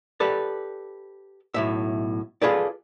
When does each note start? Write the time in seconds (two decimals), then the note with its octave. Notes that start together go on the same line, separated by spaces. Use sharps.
0.20 G4 A4 B4 D5
1.54 B1 A2 E5
2.42 F4 F#4 G#4 A4 B4 D5